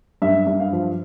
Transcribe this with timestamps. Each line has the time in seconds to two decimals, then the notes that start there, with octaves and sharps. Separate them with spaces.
0.22 G2 E5
0.47 G2
0.60 F5
0.73 F3